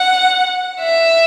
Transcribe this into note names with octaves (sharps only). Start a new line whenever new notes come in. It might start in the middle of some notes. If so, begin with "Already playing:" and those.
Already playing: F#5
E5